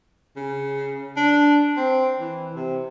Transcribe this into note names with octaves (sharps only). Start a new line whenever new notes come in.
C#3
D4
C4
E3
C3